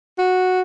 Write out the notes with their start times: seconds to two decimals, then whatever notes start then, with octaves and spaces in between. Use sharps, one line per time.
0.18 F#4